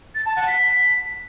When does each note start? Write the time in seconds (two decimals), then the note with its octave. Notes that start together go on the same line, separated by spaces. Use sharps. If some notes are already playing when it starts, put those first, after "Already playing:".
0.15 A6
0.25 A5
0.36 F#5
0.47 B6